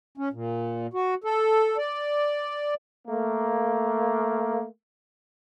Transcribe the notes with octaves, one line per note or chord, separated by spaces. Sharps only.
C#4
A#2
F#4
A4
D5
A3 A#3